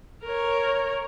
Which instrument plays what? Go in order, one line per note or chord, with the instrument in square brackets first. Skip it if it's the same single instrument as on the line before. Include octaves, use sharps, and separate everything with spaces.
[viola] A#4 C#5